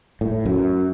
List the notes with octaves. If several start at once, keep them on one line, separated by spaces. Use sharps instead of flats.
A2
F#2